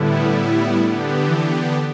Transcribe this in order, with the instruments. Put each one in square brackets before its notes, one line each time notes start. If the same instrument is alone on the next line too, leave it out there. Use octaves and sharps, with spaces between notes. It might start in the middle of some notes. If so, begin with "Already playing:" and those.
Already playing: [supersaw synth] A2 G3 B3 E4 [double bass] D3
[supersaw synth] D3 B3 D4 G4
[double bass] E3